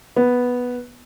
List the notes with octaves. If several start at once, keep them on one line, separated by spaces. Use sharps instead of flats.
B3